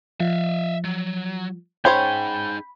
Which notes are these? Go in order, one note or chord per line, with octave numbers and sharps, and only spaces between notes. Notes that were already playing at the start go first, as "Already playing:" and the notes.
F3 E5 F5
F#3
C#4 D#4 G#4 C5 C#5 G5 B5